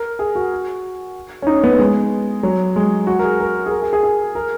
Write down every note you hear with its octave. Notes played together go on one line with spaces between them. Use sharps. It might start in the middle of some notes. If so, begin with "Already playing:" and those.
Already playing: A#4
G#4
F#4
C#4
D#4
B3
G#3
F#3
G#3
F#4
A#4
G#4
A#4
G#4
A#4
G#4
G#4
G#4
A#4